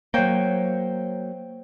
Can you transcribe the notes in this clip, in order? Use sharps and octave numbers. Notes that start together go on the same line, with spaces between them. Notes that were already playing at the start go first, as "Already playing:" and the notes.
F#3 A#3 C5 C#5 G5